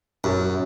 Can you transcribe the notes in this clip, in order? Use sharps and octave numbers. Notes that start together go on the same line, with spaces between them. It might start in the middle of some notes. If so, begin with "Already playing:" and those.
F#2